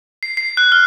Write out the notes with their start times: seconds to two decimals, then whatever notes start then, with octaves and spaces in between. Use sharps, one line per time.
0.23 C7
0.37 C7
0.57 F#6
0.72 F6